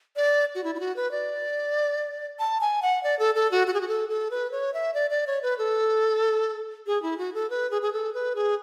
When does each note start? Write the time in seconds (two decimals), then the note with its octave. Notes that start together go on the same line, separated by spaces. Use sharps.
0.16 D5
0.55 F#4
0.64 E4
0.75 E4
0.80 F#4
0.96 B4
1.11 D5
2.39 A5
2.61 G#5
2.82 F#5
3.03 D5
3.19 A4
3.35 A4
3.51 F#4
3.67 F#4
3.74 G#4
3.81 F#4
3.88 A4
4.09 A4
4.31 B4
4.52 C#5
4.74 E5
4.94 D5
5.10 D5
5.27 C#5
5.43 B4
5.58 A4
6.87 G#4
7.02 E4
7.18 F#4
7.34 A4
7.50 B4
7.71 G#4
7.82 G#4
7.93 A4
8.14 B4
8.35 G#4